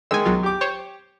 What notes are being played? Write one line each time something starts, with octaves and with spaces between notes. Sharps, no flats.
D#3 G#3 G#5 E6
B1 F#3 F4
G4 D6
C5 C#5